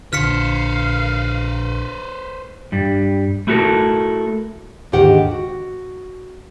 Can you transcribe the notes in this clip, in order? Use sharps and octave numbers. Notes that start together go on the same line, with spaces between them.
A#1 D3 B4 C5 F5 F6 B6 C#7
G2 G3
A3 E4 F#4 G4 A4 A#4
D#2 G#2 D3 D#3 G4 F#5
F#4